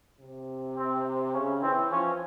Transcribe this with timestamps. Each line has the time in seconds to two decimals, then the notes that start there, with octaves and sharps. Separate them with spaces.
0.20 C3
0.77 C4
1.34 C#3 C#4
1.63 E3 C4
1.92 F3 C#4